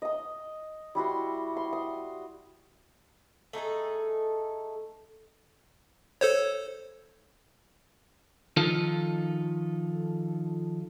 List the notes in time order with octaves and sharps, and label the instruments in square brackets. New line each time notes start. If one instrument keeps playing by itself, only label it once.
[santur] D#5 D#6
G3 E4 F#4 C6
C6
D#6
[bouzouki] A3 D#4 G#4 A4
[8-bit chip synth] A4 C5 C#5
[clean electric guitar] D#3 F3 D#4 F4 A4